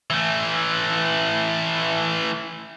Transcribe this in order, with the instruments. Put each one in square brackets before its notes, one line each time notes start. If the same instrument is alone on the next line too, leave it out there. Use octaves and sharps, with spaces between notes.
[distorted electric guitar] E3 A3